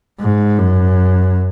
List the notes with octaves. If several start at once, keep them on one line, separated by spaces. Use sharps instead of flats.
G#2
F#2